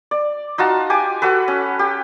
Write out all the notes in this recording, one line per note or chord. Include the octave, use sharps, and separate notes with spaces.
D5
D#4 F4 F#4 A5
G4 G#5 D6
F#4 A4 B4
C#4
G4